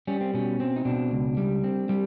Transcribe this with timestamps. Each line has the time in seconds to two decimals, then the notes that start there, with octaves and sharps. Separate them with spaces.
0.07 G3 C#4
0.21 C4
0.34 B2 C#4
0.60 C4
0.76 D#4
0.85 B2 D4
1.11 C#2
1.37 G3
1.64 C4
1.89 G3